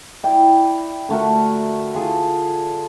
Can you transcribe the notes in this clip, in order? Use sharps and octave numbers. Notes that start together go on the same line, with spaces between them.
E4 D5 G5
D3 A3 F#4 A#4
F4 G#4 A4